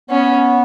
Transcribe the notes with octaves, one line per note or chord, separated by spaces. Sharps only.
B3 C#4